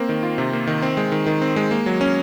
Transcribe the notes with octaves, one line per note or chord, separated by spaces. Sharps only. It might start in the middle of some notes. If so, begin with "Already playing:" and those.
Already playing: A#3 C4
D#3
F4
C3
A#3
D#3
C4
G#3
D#3
D#3
C4
G#3
A#3
F#3
C#4